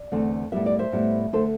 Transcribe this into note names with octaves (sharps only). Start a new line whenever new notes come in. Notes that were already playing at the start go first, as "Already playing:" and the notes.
Already playing: D5
E2 D3 A3 C4
A2 G3 B3 E5
D5
C5 E5
A2 G3 B3
D3 A3 A4 C5